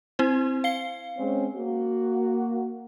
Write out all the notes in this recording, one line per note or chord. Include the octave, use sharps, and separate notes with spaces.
C4 E4 C5
F5 C7 G7
G#3 C4 C#4
A#3 F#4